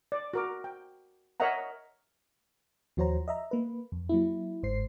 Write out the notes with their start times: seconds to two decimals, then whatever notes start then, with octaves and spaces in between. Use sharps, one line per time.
0.12 D5
0.34 F#4 A#4 D6
0.64 G5
1.40 A#4 C#5 D#5 E5 F#5 A#5
2.97 D#2 F3 F#4 C5 C#5 A#5
3.28 D#5 E5 A#5
3.51 A#3 B4
3.92 F2
4.09 F#3 A#3 E4
4.62 G1 G#2 C5 C7